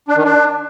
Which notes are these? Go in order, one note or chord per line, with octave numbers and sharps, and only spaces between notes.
D4
D#3
D4